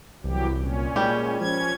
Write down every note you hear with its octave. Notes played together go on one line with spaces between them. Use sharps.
C2 E3 F#3 G4
A#2 C#4
G3 G#3 G4
F3 C#4 G#6